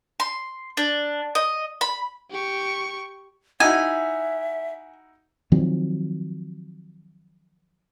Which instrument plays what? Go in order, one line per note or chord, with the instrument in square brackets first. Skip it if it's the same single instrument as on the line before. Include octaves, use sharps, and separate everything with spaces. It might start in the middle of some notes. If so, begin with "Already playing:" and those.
[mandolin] C6
D4
D#5
B5
[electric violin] G4 C#6
[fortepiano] D#4 E4 F#4 [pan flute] E5 [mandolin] G#5
[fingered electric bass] D#3 F3 F#3 C4